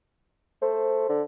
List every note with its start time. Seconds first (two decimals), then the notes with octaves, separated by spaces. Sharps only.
0.62 A3 C5
1.09 D3